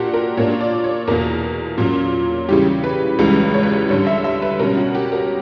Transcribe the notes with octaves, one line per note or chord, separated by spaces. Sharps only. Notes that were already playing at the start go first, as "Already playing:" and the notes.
Already playing: A#2 A#3 D4 F#4 G4
A#4
A#2 A#3 D4 C#5
D5
C#5
E2 B2 A#3 A#4
A#2 F#3 C#4
C#3 E3 G3 G4
B4
C#2 C#3 E3 G3 B4
C#5
B4
C#5
G2 D3 G3 C#5
E5
E5
B4
B2 G3 C#4 A#4
F#4
G4
A#4